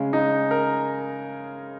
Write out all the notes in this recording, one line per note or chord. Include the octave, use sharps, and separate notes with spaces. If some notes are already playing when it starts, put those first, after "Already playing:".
Already playing: C#3 G#3
D#4
A#4